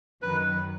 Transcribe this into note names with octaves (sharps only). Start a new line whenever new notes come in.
F#2 D#3 F#3 B4